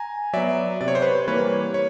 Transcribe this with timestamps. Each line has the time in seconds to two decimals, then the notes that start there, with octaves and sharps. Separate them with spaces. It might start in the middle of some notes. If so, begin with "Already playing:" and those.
Already playing: G#5 A#5
0.33 F#3 B3 D5 E5
0.81 C3 D5
0.88 C#5
0.95 C5
1.02 B4 C#5
1.27 E3 G3 A#3 B4 C#5
1.74 C#5